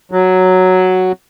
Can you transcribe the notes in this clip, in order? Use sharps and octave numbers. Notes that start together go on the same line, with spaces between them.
F#3